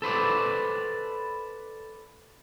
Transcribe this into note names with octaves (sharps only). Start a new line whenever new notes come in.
A4 B4 C5 D5